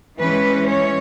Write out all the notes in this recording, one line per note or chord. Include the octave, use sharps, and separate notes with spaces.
E3 G#3 C#4 B4
C#5